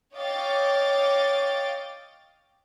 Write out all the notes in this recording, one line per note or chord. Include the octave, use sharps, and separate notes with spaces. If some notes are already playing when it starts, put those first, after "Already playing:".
C#5 D#5 F5 G5 D6 A6